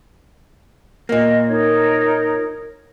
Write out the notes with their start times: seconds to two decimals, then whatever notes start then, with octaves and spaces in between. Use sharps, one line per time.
1.09 A#2 A#3 D#5
1.48 D#4 A#4 C#5